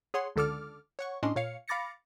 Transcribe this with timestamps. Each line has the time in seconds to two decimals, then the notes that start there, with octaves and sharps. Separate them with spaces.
0.14 G#4 C#5 F#5 C6
0.36 C#2 D3 A4 D6 F6
0.99 C#5 F#5 C#6
1.23 A2 C#4 D4 D#5 C6
1.36 A#2 C#5 F5 C#7
1.68 F5 B5 D6 A6 A#6 C#7